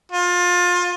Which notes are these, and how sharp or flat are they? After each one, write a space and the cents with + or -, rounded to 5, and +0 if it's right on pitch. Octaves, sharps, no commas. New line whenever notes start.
F4 +25